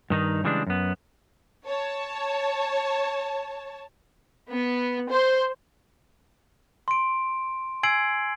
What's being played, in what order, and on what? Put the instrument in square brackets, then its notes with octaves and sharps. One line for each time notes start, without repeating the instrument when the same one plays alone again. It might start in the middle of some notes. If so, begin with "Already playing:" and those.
[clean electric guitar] G2 D#3 D#4
C#3 E3 G3 G#3 C#4 D4
F#2 B3
[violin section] C#5 A5
[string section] B3
C5
[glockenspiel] C6 D7
G#5 E6 G#6 C7 D7 F#7